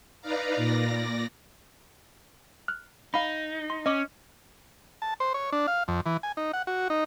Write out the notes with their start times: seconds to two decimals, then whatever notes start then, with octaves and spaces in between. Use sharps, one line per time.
0.21 D#4 B4 D5 F5 A#5
0.56 A#2 D5 A#6
2.68 F6 F#6
3.14 D#4 F5 B5
3.70 C6
3.86 C#4 D#5 C#6 D6
5.02 A5
5.20 C5
5.34 C#5
5.52 D4
5.67 F5
5.88 F2
6.06 E3
6.23 G#5
6.37 D#4
6.53 F#5
6.67 F#4
6.90 D#4